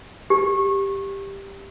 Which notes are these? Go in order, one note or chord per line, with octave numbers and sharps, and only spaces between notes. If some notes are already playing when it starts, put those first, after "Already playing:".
G4